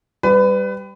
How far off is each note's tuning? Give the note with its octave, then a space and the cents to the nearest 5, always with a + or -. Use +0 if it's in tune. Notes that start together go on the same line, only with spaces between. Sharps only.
G3 +0 B4 +25